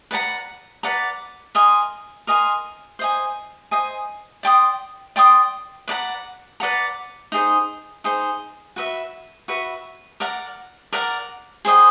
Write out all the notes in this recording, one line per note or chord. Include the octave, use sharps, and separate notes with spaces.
B4 D5 F#5 A#5
B4 D5 F#5 A#5
A#4 D#5 G#5 C6
A#4 D#5 G#5 C6
C5 D#5 G#5
C5 D#5 G#5
D5 G5 C6 D#6
D5 G5 C6 D#6
B4 D5 F#5 A#5
B4 D5 F#5 A#5
D#4 G#4 C5
D#4 G#4 C5
F#4 B4 E5
F#4 B4 E5
A#4 D5 F#5 A#5
A#4 D5 F#5 A#5
G#4 C5 D#5 G5